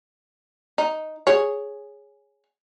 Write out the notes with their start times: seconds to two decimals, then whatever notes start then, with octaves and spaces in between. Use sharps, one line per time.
0.78 D#4
1.27 G#4 C#5